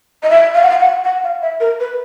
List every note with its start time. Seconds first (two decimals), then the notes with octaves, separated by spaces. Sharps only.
0.23 D#5
0.30 E5
0.55 F5
0.63 F#5
0.70 F5
0.80 F#5
1.04 F#5
1.24 F5
1.42 E5
1.60 A#4
1.80 B4